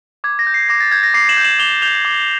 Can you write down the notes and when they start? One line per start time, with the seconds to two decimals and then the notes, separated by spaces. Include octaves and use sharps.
0.24 D6 G#6
0.39 A#6
0.47 G6
0.54 C7
0.69 D6 A#6
0.80 A6
0.92 G6 G#6
1.03 A#6
1.14 D6 C7
1.29 E7 F#7
1.37 G6
1.45 E7 F#7
1.59 D6 F7 G7
1.82 G6 F7 G7
2.05 D6